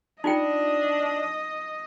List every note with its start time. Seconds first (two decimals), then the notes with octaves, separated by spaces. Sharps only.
0.24 D4 D#4 F4 D#5 G5